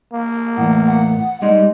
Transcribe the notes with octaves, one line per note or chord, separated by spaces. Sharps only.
A#3
E2 A2 F#5
F#5
G3 G#3 D#4 D#5